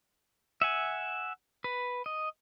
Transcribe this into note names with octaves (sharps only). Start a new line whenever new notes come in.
E5 F#5 G#5
B4
D#5